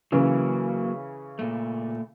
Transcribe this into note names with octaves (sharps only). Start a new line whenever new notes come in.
C#3 E3 F#3 A#3
A#2 A3